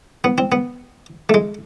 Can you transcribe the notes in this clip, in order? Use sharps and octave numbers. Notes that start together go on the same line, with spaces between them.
B3
C4
B3
A3
G#3